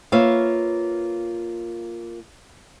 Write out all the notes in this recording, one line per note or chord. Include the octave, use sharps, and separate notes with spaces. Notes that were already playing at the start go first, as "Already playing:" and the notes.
A#3 F4 B4 C#5 E5 F5